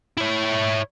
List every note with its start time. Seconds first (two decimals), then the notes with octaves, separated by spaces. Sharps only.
0.17 E4 C#5